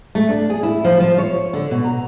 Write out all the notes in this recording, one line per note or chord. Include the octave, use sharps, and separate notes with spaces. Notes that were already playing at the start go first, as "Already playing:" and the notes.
A3
D4
G#4
E4
F3
F3
C#5
D3
B2
A#5